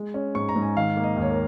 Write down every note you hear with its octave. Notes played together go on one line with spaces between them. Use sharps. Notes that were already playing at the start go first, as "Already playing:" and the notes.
Already playing: G#3
C#4
G#2 C#6
A#5
G#2
G#5
D#3 F5
A#3
D#5
D#2
C#5
A#4